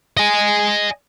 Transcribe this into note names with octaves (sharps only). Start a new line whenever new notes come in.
D#5 G#5